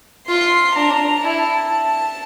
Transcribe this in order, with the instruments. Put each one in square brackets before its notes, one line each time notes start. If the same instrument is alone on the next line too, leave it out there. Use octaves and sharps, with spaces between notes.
[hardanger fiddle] F4 [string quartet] C6
[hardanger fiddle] D4 [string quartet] A#5
[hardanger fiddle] E4 [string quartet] A5